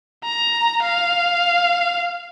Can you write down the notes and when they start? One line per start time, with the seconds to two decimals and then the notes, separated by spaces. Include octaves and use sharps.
0.24 A#5
0.82 F5